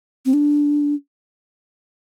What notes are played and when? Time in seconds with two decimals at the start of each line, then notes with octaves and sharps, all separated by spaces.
0.25 C4
0.33 D4